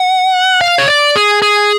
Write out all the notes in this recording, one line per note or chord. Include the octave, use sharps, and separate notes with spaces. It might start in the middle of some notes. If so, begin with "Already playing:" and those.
Already playing: F#5
F5
C#5
D5
G#4
G#4